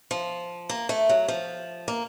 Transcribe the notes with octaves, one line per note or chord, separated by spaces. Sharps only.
F3
A#3
A3
F#3
F3
A#3